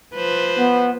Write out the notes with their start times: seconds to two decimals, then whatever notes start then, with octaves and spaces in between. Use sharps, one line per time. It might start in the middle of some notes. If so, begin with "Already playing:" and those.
0.15 F3 B4 C5
0.59 B3